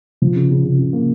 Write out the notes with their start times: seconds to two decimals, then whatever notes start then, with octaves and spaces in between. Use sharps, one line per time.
0.22 F3
0.35 C#3
0.50 C#3
0.64 C#3
0.79 C#3
0.93 A#3